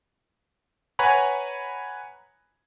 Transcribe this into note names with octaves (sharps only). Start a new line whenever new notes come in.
B4 C#5 F#5 G#5 A#5 B5